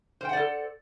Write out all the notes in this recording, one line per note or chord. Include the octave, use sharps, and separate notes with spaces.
A4 C5 D5 F#5 G5